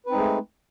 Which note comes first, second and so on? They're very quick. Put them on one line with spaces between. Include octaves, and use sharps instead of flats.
B4 C4 D#4 G#3 A3